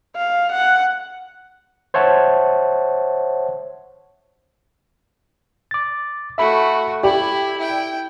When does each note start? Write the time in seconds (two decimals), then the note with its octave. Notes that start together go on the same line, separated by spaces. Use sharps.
0.16 F5
0.52 F#5
1.94 C5 C#5 E5 F#5 A5
5.71 D6 A6
6.38 A3 F#4 E5 B5
7.03 E4 G4 D5 B5
7.57 E4 G5